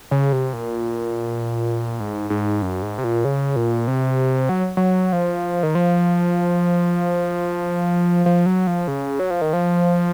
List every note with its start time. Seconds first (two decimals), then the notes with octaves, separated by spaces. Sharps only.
0.11 C#3
0.33 C3
0.53 A#2
2.00 G#2
2.30 G#2
2.62 F#2
2.82 G#2
2.98 C3
3.04 A#2
3.25 C#3
3.56 A#2
3.87 C3
4.49 F#3
4.77 F#3
5.13 F3
5.63 D#3
5.75 F3
8.26 F3
8.46 F#3
8.67 F3
8.88 C#3
9.19 F#3
9.30 F3
9.41 D#3
9.53 F3